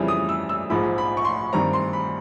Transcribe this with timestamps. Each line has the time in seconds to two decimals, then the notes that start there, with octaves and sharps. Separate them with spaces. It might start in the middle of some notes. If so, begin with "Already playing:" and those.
Already playing: F2 C#3 E3 G3
0.08 D#6
0.29 E6
0.49 E6
0.70 A#1 G#2 F3 B5
0.98 B5
1.17 C#6
1.25 C6
1.53 G2 D#3 G3 C4 A#5
1.73 C6
1.93 B5